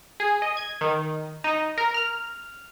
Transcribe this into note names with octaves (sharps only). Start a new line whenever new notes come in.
G#4
D#5
G#6
D#3
D#4
A#4
F6